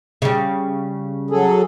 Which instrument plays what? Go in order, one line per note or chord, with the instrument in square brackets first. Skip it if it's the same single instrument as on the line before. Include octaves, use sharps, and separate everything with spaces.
[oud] C#3 G3
[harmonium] F#3 G#4 A4